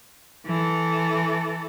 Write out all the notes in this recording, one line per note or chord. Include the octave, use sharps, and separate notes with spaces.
E3 A4